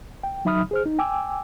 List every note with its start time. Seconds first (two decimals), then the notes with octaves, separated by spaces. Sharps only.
0.23 G5
0.45 F#3 D#4 E5 B5 D#6 F6
0.71 G#4 C5 F6
0.86 D#4
0.99 G5 G#5 D6 E6